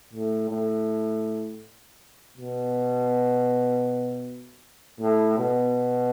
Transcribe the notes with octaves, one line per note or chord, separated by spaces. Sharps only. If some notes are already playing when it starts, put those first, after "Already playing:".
A2
A2
B2
A2
B2